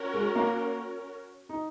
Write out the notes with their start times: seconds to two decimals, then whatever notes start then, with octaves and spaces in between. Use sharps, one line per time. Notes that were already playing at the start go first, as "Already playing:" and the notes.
Already playing: C#4 F#4 A#4 C#5
0.14 G#3
0.35 A#3
1.49 D#4